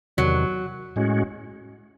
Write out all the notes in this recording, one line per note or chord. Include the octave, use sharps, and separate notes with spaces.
E2 C3 D#3 F#3
A2 G#3 C#4 F#4